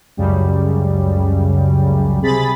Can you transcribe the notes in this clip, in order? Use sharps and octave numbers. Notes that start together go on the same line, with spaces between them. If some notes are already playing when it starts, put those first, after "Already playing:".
C#2 F#2 C#3 G3
C3 G#4 B5 A6